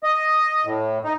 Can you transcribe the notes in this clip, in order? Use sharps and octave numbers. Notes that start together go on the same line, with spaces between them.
D#5
A2
D#4